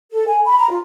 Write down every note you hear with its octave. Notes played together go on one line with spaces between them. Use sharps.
A4
G#5
B5
A#5
F4